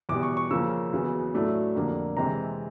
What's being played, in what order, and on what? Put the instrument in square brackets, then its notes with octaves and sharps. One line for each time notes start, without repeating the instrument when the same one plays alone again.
[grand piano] E2 B2 G3 D6
C#6
C#6
C#3 F3 A#3 C#4 E6
E2 C#3 F#3 B3
A2 F#3 A3 D4
F2 D3 G3 A#3 D4
C3 E3 G#3 C4 A#5